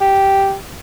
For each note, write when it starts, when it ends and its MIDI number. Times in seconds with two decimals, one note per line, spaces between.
0.01 0.55 67